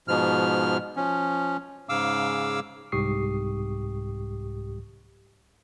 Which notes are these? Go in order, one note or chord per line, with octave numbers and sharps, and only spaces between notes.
G#2 B2 F3 F6
F3 C#4
G#2 C#3 F5 D6 E6
C2 G#2 G4 C#6 D#6 C7